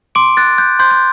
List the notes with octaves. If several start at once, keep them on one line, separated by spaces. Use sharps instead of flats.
C6 D6 D7
F#6 A6
F#6 G6
C6 G6
G6